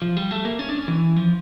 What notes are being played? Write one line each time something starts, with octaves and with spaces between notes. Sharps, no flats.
F3
G3
A3
A#3
C#4
D4
C#4
E3
F3